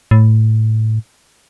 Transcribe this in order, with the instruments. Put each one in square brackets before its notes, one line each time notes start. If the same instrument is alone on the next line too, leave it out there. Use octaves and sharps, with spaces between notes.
[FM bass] A2